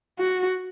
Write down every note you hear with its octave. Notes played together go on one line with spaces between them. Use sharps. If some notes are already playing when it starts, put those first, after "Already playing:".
F#4